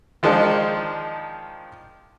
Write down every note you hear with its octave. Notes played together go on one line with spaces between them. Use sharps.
D#3 F3 G#3 D4 D#4